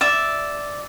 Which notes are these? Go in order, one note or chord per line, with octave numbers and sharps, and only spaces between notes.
D5 E5